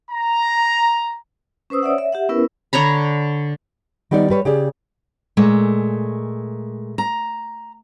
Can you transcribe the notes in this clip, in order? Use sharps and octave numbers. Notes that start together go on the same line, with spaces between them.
A#5
C#4 B4 C5 D#6 E6
C#5 D5 E5 F#5
E5
G4 E5 F#5
B3 C#4 E4 A#4 B4
D3 C#5 A#5 B5
D#3 G3 B3 D#4 D5
G3 B4 C#5
C#3 G4 G#4 D5
A#2 G#3 A3
A#5